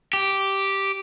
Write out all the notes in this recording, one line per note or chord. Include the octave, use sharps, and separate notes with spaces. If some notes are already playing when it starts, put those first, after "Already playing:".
G4